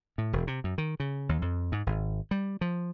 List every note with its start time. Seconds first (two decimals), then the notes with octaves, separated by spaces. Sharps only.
0.18 A2
0.33 E1
0.47 C3
0.64 F#2
0.78 D#3
1.00 C#3
1.29 D#2
1.42 F2
1.72 G#2
1.86 G#1
2.31 G3
2.61 F3